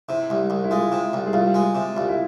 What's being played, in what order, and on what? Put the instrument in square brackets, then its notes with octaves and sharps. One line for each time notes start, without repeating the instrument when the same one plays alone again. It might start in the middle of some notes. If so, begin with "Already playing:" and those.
[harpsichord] C3 [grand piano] E4
[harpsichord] C2
C2
[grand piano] E4
[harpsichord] G#3 [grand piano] F4
[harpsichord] C3
C2
[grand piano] G#4
[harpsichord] C2 [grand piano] F4
[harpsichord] G#3
C3
[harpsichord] C2 [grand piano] F4
[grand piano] E4